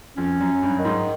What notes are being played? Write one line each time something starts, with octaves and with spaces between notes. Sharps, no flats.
F2 C#4
F#2
F#3
G2
D#3
G#2